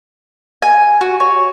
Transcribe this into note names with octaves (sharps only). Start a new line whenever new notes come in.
G#5
F#4
C#5